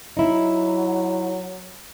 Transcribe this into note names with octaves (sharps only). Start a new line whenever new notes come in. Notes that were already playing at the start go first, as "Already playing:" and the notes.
F#3 D#4 E4